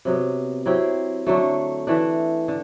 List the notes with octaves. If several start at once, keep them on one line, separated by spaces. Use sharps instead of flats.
C3 F#3 B3
F#3 C4 E4 G4
D3 F#3 A3
E3 A3 D4
D3